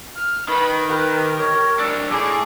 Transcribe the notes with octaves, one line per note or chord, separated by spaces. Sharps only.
F6
D#3 B4 B5
G4 A#4 B4
C#5
D4 C#5 E6
A2 G#4 D6